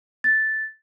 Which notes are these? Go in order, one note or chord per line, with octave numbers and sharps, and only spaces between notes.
A6